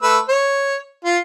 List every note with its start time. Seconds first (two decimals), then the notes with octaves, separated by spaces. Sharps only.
0.03 A3 B4 E6
0.29 C#5
1.05 F4